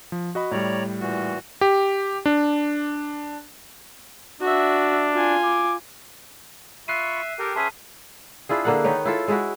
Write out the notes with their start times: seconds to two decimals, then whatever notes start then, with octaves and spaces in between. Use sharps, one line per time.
0.12 F3
0.35 F#4 D#5 B5
0.51 A2 G3 C#5 D5 A#5
1.00 A#2 E3 F#4
1.61 G4
2.26 D4
4.41 D4 F#4 E5
5.13 F4 G#5
5.44 D6
6.88 F4 E5 B5 C#6 F#6 C7 D#7
7.39 G4 A4 A#4 G5
7.56 C#4 G#4 B4 E5 A5 C6 D#7
8.49 D4 E4 F4 G#4
8.65 D3 A#3 F#5
8.84 D#3 D#4 B4 C#5
9.05 E4 F4 A4
9.28 G#3 E4 F#4